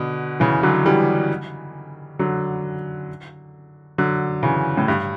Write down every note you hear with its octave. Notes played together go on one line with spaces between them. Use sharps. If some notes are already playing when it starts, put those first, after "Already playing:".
Already playing: B2 D3
C#3 E3
D3 F#3
E3 G3
D3 F#3
D3 F#3
C#3 E3
A2
G2